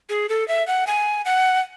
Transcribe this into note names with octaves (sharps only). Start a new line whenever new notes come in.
G#4
A4
E5
F#5
G#5
F#5